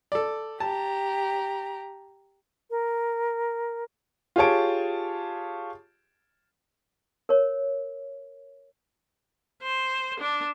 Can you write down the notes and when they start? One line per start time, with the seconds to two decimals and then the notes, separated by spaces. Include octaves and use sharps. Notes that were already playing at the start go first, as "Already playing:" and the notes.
0.12 A4 D5
0.60 G4 A5 A#5
2.70 A#4
4.36 F4 G4 G#4 C#5 A5 D7
7.29 A#4 C#5
9.62 C5
10.20 D4